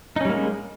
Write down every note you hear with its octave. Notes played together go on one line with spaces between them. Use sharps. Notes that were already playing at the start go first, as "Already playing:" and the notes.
G3 G#3 A#3 C#4 D#4